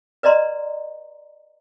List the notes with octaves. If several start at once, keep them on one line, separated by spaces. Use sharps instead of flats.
B4 D5 D#5 A#5 C6